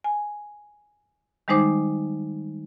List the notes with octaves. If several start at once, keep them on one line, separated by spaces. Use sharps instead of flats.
G#5
D#3 G3 G#3 D#4 C5 D6